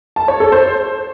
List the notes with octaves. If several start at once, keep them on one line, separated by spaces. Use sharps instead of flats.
A5
C#5
A4
C5